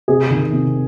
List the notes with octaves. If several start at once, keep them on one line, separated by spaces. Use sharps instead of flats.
C3 G#4
D#3
C3